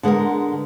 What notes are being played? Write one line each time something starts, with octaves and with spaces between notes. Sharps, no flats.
D3 G#3 B3 D#4 A#4